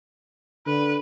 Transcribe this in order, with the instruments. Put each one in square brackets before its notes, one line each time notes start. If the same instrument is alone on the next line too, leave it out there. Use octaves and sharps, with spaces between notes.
[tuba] D3 [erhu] B4